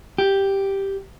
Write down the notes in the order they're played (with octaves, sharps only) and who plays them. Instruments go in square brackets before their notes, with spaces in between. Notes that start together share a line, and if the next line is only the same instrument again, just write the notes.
[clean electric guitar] G4